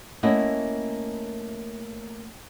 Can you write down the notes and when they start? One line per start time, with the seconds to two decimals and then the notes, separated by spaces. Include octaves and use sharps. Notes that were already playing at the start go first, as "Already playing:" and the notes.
0.23 A3 A#3 C#4 E4 D#5 F#5